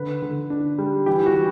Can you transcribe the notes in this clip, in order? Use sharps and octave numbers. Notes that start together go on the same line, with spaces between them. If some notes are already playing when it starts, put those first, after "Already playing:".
Already playing: D3 B4
D3
D4
G3
E3 G4
F#4
E3